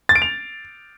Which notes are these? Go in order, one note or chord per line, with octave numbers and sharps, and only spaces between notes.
A6
D7
F7